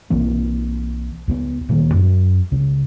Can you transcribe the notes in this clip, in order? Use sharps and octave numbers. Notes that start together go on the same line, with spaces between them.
B1 E3 A#3 C4
C#2 G#3 B3
D1 A#2 D#3 A#3
F#2 F#3
C#2 C#3